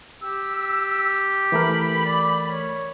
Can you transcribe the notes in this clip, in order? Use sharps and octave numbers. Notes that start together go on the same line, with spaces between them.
G4 E6
E3 A3 A#4 B5
D5
C#5